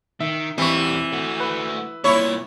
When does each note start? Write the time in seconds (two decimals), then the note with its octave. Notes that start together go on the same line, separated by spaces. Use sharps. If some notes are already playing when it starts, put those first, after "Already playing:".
0.20 D#3 E5
0.58 E2 E3 G3 C4 C#6
1.13 A3 F#4
1.40 B4
2.04 C2 A#2 E4 C#5